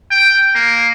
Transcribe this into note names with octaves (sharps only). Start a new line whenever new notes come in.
G5
A#3